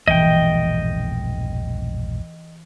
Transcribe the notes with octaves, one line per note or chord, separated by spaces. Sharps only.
E1 A#1 G2 E3 D#5 G5